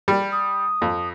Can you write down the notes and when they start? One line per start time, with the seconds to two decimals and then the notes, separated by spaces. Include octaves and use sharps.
0.08 G3
0.32 D#6
0.82 F2